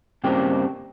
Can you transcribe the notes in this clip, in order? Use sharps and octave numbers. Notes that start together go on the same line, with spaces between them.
G2 C#3 A#3 C4 G4